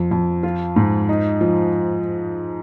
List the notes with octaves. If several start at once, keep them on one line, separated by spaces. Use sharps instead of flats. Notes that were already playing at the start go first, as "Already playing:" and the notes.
Already playing: F2
F2
F4
G#2
D#4
F3